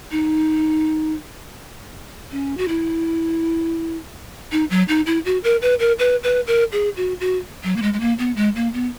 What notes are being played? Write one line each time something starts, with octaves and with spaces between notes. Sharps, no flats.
D#4
C#4
F#4
E4
D#4
F#3
D#4
E4
F#4
A#4
B4
A#4
B4
B4
A#4
G#4
F#4
F#4
F#3
A#3
G#3
G#3
A#3
B3
G#3
A#3
B3